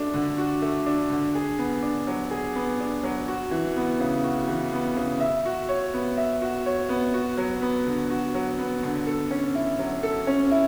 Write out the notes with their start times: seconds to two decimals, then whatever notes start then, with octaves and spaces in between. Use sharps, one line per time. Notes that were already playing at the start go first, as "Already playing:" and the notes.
Already playing: A3 D4 F#4
0.14 D3
0.38 F#4
0.62 A3
0.86 D4
1.10 D3
1.35 G#4
1.59 B3
1.83 D4
2.07 F#3
2.31 G#4
2.55 B3
2.80 D4
3.03 F#3
3.28 F#4
3.51 E3
3.77 B3
4.00 C#3
4.24 F#4
4.48 E3
4.72 B3
4.97 C#3
5.20 E5
5.45 F#4
5.69 C#5
5.94 B3
6.18 E5
6.42 F#4
6.66 C#5
6.89 B3
7.14 F#4
7.37 F#3
7.62 B3
7.86 D3
8.10 F#4
8.34 F#3
8.59 B3
8.83 D3
9.07 A4
9.31 C#4
9.55 E4
9.79 F#3
10.03 A4
10.27 C#4
10.51 E4